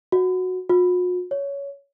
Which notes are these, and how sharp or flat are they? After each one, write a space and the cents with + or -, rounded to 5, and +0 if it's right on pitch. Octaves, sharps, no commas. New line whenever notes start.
F#4 -10
F#4 -45
C#5 +15